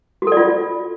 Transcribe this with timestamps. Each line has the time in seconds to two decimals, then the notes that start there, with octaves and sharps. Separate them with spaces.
0.22 F#4
0.27 A4
0.32 D5
0.37 F4